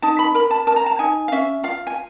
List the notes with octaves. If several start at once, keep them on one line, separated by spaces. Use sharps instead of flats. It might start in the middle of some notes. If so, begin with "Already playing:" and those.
D#4 A5
B5
A#4 B5
A5
A#4 A5
A#5
A5
D#4 G#5
F5
C#4 E5
F4 F5
G#5